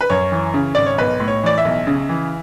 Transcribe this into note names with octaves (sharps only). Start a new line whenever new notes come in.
B4
F#2 C#5
E3
C#3
G#1 D5
C#5
B1 B4
A2
C#5
E3 D5
E5
B1
C#3
E3